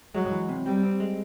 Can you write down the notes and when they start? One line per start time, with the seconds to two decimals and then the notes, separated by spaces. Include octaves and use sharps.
0.15 F#3 G#3
0.31 E3
0.49 C3
0.66 G3 C4
0.83 C4
1.00 G#3